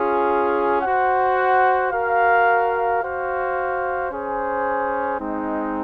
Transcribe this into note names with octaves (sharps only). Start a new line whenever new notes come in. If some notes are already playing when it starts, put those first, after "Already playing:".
Already playing: C#4 F4 G#4
F#4 C5 F#5
F#4 A#4 F5
F#4 C5 F5
C#4 G#4 C5
G#3 C4 D#4